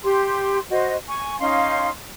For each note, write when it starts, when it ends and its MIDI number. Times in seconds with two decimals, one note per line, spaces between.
0.03 0.59 67
0.03 0.59 84
0.69 0.95 66
0.69 0.95 72
0.69 0.95 75
1.07 1.39 80
1.07 1.39 85
1.39 1.89 61
1.39 1.89 63
1.39 1.89 77
1.39 1.89 84